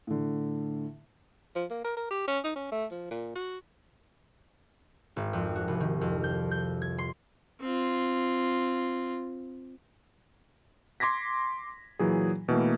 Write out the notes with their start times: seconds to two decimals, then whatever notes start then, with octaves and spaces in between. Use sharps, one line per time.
0.07 A2 D3
1.55 F3
1.70 A#3
1.84 A#4
1.97 A#4
2.11 G4
2.28 C#4
2.44 D#4
2.56 C#4
2.72 A3
2.91 F3
3.11 A#2
3.35 F#4
5.16 G#1
5.33 F2
5.55 F#4
5.68 C2
5.80 D#3
6.01 F2
6.24 G6
6.51 G6
6.82 G#6
6.98 C6
7.61 C4 F4
11.00 C6 D6 G#6 A#6 B6
11.99 A#2 E3 F#3 G#4
12.48 B2 E3 A3 A#3